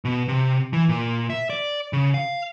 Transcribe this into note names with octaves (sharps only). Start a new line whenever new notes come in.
B2
C3
E3
A#2
E5
D5
C#3
F5